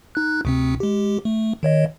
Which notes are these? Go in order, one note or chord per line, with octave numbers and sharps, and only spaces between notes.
D#4 F#6
D2 C3 C4
G#3 G4
A3
D#3 C#5 D#5